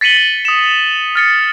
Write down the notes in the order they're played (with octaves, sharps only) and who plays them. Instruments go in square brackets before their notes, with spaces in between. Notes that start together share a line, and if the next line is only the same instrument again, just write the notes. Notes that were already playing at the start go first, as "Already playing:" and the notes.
[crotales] A6 B6 C#7 D#7 F#7 G7
D#6 E7
F6 A6 C#7